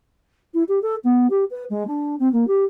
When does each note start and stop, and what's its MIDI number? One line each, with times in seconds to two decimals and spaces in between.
0.54 0.63 64
0.69 0.79 67
0.82 0.96 69
1.04 1.27 59
1.30 1.45 67
1.51 1.64 71
1.70 1.86 56
1.87 2.16 62
2.20 2.31 60
2.33 2.47 58
2.48 2.64 67